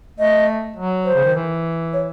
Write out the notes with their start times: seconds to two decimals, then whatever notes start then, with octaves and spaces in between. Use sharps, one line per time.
0.19 A3 D#5
0.76 F#3
1.05 C5
1.14 C#3
1.24 D#3
1.35 E3
1.93 C#5